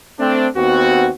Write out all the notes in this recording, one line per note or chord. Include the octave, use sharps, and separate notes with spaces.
A3 C4 D4
D#2 B3 C4 F#4